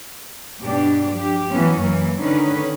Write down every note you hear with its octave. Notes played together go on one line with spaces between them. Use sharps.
G2 B2 D4 G4
F3 G4
E3 F#3 B3 C#4
F#2 E3 A#3
D3 D#3 C#4 B4